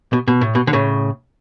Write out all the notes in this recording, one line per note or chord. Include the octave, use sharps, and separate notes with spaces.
B2
B2
A2
B2
D3
A2 C#3